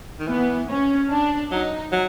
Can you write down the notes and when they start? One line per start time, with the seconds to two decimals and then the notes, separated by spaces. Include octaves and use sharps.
0.20 D#3
0.27 E3 B3
0.69 C#4
1.10 D4
1.51 F#3 D#4
1.92 F#3